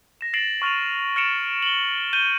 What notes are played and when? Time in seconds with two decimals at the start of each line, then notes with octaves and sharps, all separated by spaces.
0.21 A#6 E7
0.34 A6 A#6 C7 D7 E7 F#7
0.62 C#6 F6 A6 D#7 F7
1.16 F6 A6 C#7 D7 E7 F7
1.62 F#7 G7
2.13 G6 D#7 G7